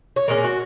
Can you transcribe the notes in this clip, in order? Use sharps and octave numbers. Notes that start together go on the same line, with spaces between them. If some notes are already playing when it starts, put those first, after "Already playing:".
C#5
A#2 G#3 C#4 A#4
F#4